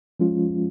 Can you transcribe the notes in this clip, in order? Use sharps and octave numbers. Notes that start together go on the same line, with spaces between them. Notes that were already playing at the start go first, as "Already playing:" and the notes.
F3 G#3 C#4 F4